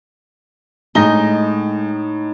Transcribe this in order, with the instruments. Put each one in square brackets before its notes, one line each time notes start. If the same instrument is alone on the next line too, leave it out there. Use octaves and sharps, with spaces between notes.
[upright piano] A2 A#6 G7 [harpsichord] G#3 [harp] D#4